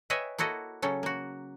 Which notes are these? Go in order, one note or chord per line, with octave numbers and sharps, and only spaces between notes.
B4 C#5 D#5 E5 G5 G#5
A#3 E4 F#4 A4 D#5
C#3 F#3 C#4 A4
A#3 F#4